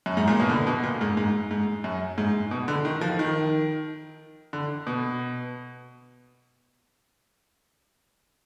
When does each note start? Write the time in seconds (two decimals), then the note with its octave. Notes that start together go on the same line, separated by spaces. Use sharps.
0.06 F#2
0.17 G#2
0.27 A#2
0.40 B2
0.50 D3
0.67 B2
0.83 A#2
1.01 G#2
1.17 G#2
1.51 G#2
1.84 F#2
2.18 G#2
2.51 B2
2.68 D3
2.85 D#3
3.01 F3
3.19 D#3
4.53 D3
4.87 B2